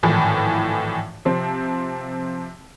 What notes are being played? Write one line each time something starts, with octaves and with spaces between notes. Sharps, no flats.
G#1 A2 E3 F3
C3 F3 C4